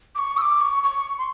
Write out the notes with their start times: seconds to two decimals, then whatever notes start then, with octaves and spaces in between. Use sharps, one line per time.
0.15 D6
0.18 C#6
0.37 E6
0.42 D6
0.61 C#6
0.84 C#6
1.18 C6